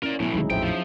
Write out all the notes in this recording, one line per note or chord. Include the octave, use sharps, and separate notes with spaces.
C#4 E4 A#4 D5
B1 A2 F#3 B3 C#4 E4
D2 D#3 F#3 G#3 D#4 G#4
A#1 F2 A2 C5 E5 G5
F3